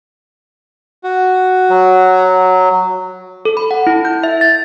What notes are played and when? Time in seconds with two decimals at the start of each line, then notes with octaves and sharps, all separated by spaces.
1.04 F#4
1.70 F#3
3.45 A4
3.57 B5
3.71 F#5
3.87 E4
4.05 G6
4.23 E5
4.41 A6